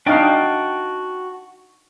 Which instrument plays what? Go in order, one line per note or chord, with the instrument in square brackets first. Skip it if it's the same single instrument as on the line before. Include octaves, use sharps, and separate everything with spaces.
[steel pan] D4 D#4 F5 [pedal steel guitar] F#4 G5 A5